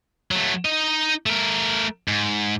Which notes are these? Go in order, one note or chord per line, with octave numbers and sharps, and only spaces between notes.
F#3 A3
D#4 D#5
A3 A#4
G#2